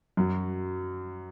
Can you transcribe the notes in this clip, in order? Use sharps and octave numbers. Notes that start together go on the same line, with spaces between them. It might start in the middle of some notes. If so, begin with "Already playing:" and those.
F#2 F#3